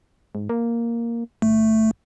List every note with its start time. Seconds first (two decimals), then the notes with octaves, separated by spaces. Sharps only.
0.35 G#2
0.49 A#3
1.42 G1 A3